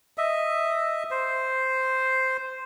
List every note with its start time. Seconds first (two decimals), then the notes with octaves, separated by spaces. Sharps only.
0.18 D#5 E5
1.11 C5